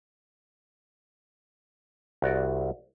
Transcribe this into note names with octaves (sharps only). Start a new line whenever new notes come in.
C2 F#4 D5